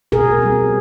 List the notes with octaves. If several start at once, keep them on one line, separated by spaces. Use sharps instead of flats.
B2 G#4 A#4
G3 C4